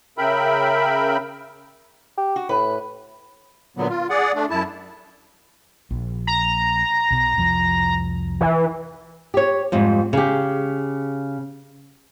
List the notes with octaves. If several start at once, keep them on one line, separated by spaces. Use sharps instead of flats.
C#3 A#4 E5 G5 B5
G4
F#4
A2 B4
A#2 D3 F#3 B3
F4
G#4 D5 F#5
A3 D4
F#2 E4 A5
A#1
A#5
B1 B2
C2 F2 F3
E3
G4 C#5
F2 G#2 G3
C#3 G4